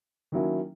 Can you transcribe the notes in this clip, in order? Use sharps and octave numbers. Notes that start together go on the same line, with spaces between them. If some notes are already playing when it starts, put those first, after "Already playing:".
D#3 F#3 A#3 C#4 E4